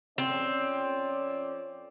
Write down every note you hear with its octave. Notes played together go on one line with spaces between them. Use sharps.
F2 C4 C#4 D5